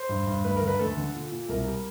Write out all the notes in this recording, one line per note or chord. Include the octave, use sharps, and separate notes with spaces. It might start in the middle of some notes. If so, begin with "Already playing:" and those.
Already playing: C5
G2
G2
D2 B4
A#4
D3
B4
D2 A4
D3
A#2
A#2
C2 A#4
G3